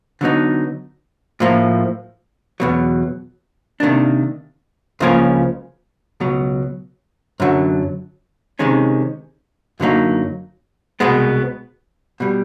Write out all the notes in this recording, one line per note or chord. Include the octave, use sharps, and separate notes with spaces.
D3 F#3 B3 D#4
A2 F3 A#3
E2 B2 F#3
C3 D#3 G3 A#3 D4
C#2 C#3 F3 A#3 C#4
C#2 B2 F#3
F#2 D3 F#3
C3 D#3 G#3 C#4
F#2 D3 F#3 A#3 D#4
C2 B2 G#3 B3
B2 G3